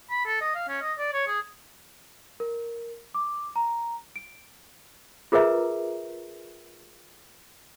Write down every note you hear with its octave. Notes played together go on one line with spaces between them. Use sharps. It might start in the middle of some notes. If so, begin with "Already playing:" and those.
B5
A4
D#5
F5
C#4
D#5
D5
C#5
G#4
A#4
D6
A#5
D7
F4 G#4 A#4 B4 E5 A#5